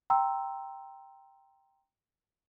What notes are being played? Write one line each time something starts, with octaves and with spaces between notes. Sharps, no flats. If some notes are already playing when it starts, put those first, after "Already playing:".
G5 A#5 C6 E6